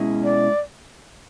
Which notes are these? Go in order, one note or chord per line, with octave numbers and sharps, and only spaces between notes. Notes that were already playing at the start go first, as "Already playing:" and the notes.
Already playing: B2 G#3 C#4 E4 G#4
D5